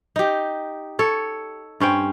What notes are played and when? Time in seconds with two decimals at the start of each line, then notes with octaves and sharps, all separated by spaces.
0.16 D#4 G4
0.99 A4 C#5
1.80 G2 C#4 C5 G5